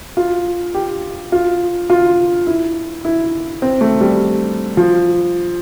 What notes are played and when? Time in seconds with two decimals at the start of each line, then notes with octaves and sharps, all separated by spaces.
0.17 F4
0.75 G4
1.32 F4
1.90 F4
2.47 E4
3.05 E4
3.62 C4
3.81 A3
4.01 G3
4.77 F3